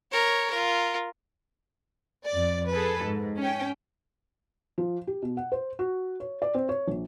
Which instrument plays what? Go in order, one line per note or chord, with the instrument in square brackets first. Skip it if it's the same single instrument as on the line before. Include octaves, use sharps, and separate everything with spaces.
[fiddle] A#4 C#5
F4 A#4
[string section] F2 D5
G#4 A4 B4
G#2
C#4 G5
[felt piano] F3
G4
B2
F#5
C5
F#4
C#5
D5
C4
C#5
A#1